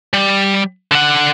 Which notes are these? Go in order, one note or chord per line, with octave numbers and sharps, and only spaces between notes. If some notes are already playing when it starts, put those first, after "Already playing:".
G3
D3 F#5